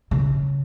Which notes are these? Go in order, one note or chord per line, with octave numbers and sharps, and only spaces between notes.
C#3